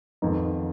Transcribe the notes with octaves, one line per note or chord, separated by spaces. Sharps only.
F2 D#3 B3 D#4